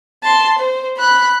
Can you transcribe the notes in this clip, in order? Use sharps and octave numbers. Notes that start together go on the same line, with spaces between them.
A5 C6
C5
B5 F#6